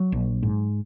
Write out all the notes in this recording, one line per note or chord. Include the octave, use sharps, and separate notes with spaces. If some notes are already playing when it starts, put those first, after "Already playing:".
Already playing: F#3
A#1
G#2